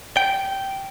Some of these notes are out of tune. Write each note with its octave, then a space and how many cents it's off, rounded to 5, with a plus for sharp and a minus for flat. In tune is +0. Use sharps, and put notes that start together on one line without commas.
G5 -10